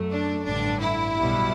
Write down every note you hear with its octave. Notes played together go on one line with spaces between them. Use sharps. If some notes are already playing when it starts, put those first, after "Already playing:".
Already playing: F#2 F#3 A3
D4
A1 G2 D3 D4
E4
B1 B2 G3 B3